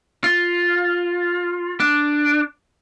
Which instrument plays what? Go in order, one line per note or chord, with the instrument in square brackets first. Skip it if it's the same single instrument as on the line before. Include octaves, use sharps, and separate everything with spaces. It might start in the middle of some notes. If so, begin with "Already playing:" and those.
[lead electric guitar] F4
D4